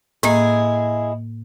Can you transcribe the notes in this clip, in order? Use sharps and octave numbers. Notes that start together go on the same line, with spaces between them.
A2 G#3 A#3 E4 G#4